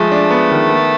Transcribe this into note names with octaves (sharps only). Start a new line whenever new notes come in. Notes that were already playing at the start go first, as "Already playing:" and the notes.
Already playing: F3 G#3 A3
D4
B3
D#3
B3